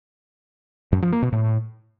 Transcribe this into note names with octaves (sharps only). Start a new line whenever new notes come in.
F#2
F3
A#3
B2
A2